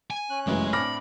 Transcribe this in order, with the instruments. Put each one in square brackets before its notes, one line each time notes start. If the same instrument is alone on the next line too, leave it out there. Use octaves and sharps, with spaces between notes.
[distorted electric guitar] G#5
[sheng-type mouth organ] C#4 F#6
[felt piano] A1 F#2 [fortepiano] C#3 B4 [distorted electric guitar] G#3
[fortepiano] A2 C4 D4 [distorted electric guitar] B5 [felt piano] D6 F6 A#6